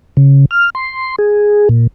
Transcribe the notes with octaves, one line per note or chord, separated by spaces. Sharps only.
C#3
F6
C6
G#4
A#2